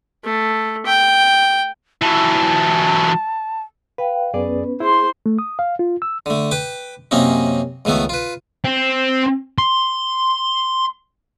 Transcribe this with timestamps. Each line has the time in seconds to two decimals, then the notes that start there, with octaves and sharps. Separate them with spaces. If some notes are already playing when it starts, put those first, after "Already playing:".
0.24 A3
0.86 G5
2.02 E3 F#3 A5
3.98 B4 F5 G5
4.34 F#2 B3 C#4 G#4 B4 D5
4.80 E4 G#4 C5 C6
5.26 A3
5.39 D#6
5.59 F5
5.79 F4
6.02 E6
6.26 D3 A3
6.51 B4 G5 D6
7.11 F#2 C3 A#3 C4 C#4 D#4
7.85 C#2 D#3 A3 B3 A4
8.09 F4 B4
8.64 C4
9.58 C6